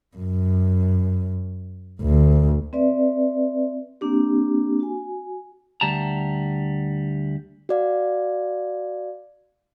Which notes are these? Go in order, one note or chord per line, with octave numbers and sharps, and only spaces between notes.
F#2
D2
C4 B4 D5 E5
A#3 C4 D4 G4
F#4 G#5
D2 G3 A5 A#5
F#4 D5 F5